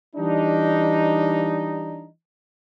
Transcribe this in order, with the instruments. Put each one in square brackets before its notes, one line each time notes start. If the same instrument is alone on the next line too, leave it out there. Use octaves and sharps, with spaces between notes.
[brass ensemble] E3 G3 D4 D#4